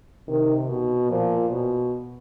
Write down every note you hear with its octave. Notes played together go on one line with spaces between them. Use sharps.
C3 D#3
B2
A#2 F3
B2